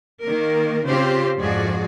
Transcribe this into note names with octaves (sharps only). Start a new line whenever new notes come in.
D#3 A#3 A#4
C#3 C4 F4 G4 C5
F2 G#2 F3 F#4 G#4 D5